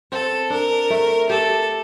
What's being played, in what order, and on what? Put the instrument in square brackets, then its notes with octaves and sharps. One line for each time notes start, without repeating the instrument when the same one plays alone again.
[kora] C4 [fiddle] A4
[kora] D4 [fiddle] A#4
[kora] A3
[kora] G4 [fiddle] A4